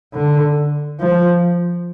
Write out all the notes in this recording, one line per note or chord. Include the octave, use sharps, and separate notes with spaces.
D3
F3